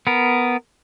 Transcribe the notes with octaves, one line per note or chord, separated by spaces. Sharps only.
B3 A#4